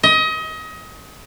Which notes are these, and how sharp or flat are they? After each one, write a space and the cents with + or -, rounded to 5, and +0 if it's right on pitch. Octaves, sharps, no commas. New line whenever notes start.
D#5 +30